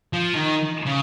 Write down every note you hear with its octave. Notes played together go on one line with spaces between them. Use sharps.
F3
D#3
C#3